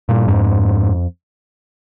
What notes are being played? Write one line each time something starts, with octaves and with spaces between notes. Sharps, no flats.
G2 A#2
F2 G#2